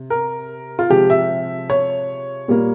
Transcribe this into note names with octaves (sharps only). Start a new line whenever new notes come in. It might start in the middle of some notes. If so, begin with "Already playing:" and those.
Already playing: C3
A#4
F4
C3 F3 G#3 G4
E5
C#5
A#2 G3 A#3